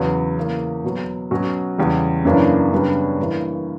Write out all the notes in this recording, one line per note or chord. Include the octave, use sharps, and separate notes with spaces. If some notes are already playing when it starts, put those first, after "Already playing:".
Already playing: E2 C#3 F#3 B3
C#3 E3 A#3
B2 F#3 B3 F#4
B2 F#3 C#4 F#4
E2 C#3 G3
F#2 C#3 E3 A#3 D4
F#2 C#3 G3 B3 D4
G2 E3 A#3